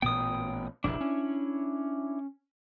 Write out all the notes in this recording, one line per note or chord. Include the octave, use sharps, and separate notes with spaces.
A1 A#2 B3 G5 D#6
F1 A#1 F3 D4 E4
C#4